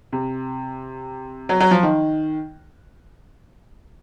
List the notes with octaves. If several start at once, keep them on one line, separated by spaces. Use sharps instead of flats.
C3
F#3
F#3
F3
D#3